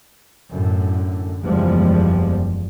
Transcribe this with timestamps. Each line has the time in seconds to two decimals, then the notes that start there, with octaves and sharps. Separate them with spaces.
0.52 F#2 A2 D3
1.44 F#1 E2 F3 G3 G#3